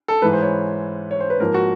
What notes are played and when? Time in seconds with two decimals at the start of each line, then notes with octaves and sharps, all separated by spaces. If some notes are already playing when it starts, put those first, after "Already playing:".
0.08 A4
0.22 G#2 E3 G#3 B4
0.33 C5
0.42 C#5
1.11 C#5
1.20 C5
1.30 B4
1.40 G#2 F3 A#3 A#4
1.54 F#4